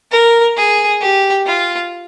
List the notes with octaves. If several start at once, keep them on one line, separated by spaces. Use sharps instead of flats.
A#4
G#4
G4
F4